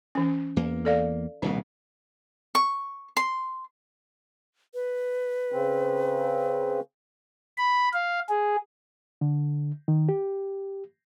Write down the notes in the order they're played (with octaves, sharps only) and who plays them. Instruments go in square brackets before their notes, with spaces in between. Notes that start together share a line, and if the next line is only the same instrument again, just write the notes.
[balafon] E3 C#4
[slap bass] E2 A#3
[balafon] A4 D5 F5
[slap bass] D#1 C2 B2 [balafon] D4
[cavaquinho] C#6
C6
[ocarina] B4
[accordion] C#3 C4
[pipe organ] B5
F5
G#4
[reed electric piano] D3
D#3
G4